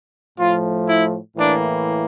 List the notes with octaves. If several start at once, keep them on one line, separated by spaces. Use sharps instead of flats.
A2 F3 A3 F4
E4
A2 E3 A#3 D4